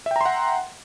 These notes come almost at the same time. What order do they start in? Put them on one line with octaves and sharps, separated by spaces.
E5 G5 A#5 C6 F#5